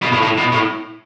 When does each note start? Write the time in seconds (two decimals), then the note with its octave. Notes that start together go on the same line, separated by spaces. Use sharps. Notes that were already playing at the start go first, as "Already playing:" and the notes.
0.03 B2
0.12 A2
0.23 A2
0.38 B2
0.53 A2